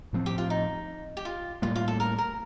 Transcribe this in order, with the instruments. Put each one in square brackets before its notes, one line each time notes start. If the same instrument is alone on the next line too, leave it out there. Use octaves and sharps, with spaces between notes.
[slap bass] A2 F3 C4
[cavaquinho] G4
F4
D#4
G4
F4
[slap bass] A2 G3 A#3 [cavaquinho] F4
[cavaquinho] F4
A4
A#4
A#4